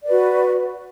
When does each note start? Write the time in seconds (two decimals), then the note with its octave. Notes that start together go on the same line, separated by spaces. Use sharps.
0.03 D5
0.06 B4
0.09 F#4